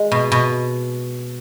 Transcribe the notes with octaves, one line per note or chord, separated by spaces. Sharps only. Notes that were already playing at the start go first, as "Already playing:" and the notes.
Already playing: G#3
B2
B2